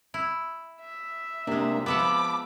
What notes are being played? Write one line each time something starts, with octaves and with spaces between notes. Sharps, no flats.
E4
E5
C3 G#3 A#3 D4
F3 B3 E5 F#5 A5 B5 D6